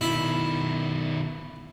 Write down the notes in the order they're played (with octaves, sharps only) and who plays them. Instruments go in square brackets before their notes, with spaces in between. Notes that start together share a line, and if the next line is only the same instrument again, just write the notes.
[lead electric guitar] B2 D#3 [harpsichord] E4